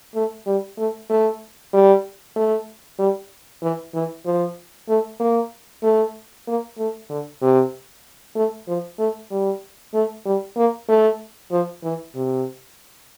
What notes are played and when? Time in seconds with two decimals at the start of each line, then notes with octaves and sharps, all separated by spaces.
0.15 A3
0.47 G3
0.78 A3
1.10 A3
1.73 G3
2.36 A3
2.99 G3
3.62 E3
3.94 E3
4.26 F3
4.89 A3
5.20 A#3
5.83 A3
6.47 A#3
6.78 A3
7.10 D3
7.42 C3
8.36 A3
8.68 F3
8.99 A3
9.31 G3
9.94 A3
10.25 G3
10.57 A#3
10.89 A3
11.51 F3
11.83 E3
12.15 C3